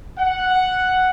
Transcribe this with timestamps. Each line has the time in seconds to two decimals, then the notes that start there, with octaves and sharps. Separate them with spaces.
0.19 F#5